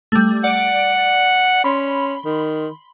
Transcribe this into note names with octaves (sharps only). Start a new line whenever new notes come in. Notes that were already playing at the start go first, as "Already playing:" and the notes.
G3 A3
D5 F#5 D7
C#4 B5 C6
D#3